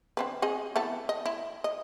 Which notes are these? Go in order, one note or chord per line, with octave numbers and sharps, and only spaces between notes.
D3 C4 B4
C4 G#4 D#5
E3 B3 A4
D#5
E4
D#5